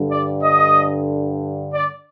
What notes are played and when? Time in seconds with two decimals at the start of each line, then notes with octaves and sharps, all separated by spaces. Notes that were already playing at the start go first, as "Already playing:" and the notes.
Already playing: G2 D3
0.10 D5
0.42 D#5
1.73 D5